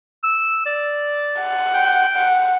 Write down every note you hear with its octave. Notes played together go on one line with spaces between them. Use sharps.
E6
D5
F#5
G5
F#5